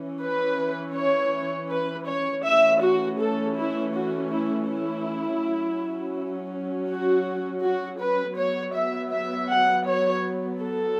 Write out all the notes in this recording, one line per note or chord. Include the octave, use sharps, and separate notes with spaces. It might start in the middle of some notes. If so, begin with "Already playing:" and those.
Already playing: E3 C#4
B4
C#5
B4
C#5
E3 A3 C#4 E5
F#4
A4
E4
F#4
E4
E4
F#3 C#4
F#4
F#4
B4
F#3 B3 C#5
E5
E5
F#5
C#5
A4